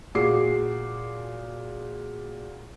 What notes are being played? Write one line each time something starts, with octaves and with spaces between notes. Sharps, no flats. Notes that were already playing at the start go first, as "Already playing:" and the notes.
A#2 F#4 G#4 D6 C7